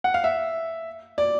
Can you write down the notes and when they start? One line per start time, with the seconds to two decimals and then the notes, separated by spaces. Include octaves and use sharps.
0.04 F#5
0.14 F5
0.24 E5
1.18 D5